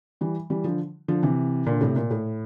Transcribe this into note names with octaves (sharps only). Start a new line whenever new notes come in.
E3 G3
E3 G3
D3 F3
D3 F3
C3 E3
A#2 D3
A2 C3
A#2
A2